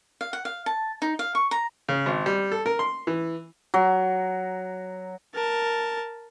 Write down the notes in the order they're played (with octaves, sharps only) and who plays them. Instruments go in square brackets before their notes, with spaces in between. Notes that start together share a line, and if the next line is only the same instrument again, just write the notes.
[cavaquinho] F5
F#5
F5
A5
D#4
F5
C#6
A#5
[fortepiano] C#3
G#1
G3
A4
A#4
C6
E3
[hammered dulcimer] F#3
[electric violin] A#4 A5